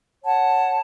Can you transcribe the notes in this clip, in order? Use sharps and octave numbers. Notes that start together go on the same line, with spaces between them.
C#5 F#5 A5